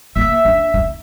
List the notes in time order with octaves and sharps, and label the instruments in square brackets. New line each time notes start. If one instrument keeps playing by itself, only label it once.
[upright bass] A#3 [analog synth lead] E5
[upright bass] D4
D#4